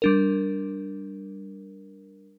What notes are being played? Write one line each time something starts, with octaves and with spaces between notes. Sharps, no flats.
G3 D4 A#4